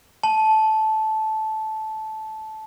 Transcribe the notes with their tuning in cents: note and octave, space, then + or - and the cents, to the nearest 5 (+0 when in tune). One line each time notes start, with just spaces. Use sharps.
A5 -15